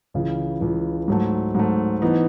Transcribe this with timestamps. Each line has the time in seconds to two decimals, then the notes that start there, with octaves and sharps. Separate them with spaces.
0.14 C#2 C#3 E3
0.60 C#2 C#3 E3
1.08 G#2 F#3 A3
1.55 G#2 F#3 A3
2.02 E3 B3 D#4